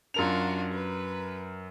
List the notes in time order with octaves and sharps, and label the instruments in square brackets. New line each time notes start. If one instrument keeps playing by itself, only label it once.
[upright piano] F#2 A#4 F7 [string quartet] D4 F4 F#4
[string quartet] B4